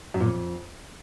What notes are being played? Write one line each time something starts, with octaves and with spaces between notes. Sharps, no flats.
F#2
A#2
F2